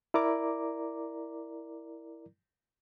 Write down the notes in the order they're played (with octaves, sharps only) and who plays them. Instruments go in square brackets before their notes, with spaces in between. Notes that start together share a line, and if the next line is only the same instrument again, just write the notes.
[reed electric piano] E4 A#4 D5 A#5 D6